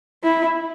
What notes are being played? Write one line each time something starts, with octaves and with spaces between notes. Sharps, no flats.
E4